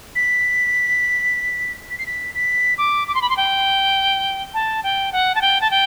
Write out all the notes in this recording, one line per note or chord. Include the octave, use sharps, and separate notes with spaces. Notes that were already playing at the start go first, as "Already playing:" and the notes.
B6
B6
C7
B6
B6
D6
D6
C6
B5
C6
G5
A5
G5
F#5
A5
G5
A5
G5